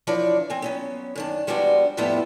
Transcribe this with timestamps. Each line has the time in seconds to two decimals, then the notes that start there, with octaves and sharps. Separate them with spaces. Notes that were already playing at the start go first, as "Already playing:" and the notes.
0.07 E3 F3 D4 C#5 D5
0.50 C4 G#5
0.62 F#3 B3 C#4
1.16 F#2 D#3 D4
1.47 F3 G3 G#3 B3 D4 F#4
1.97 F2 A2 F3 G3 B3 E4